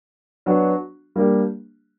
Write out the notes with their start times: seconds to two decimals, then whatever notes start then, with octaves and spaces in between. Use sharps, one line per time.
0.46 F#3 B3 D4 F#4
1.16 G3 A#3 D4 G4